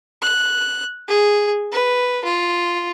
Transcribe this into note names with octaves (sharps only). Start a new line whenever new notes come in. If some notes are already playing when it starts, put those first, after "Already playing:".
F#6
G#4
B4
F4